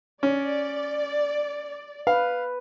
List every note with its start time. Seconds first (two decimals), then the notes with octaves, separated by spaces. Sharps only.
0.23 C#4 D5
2.07 B4 F5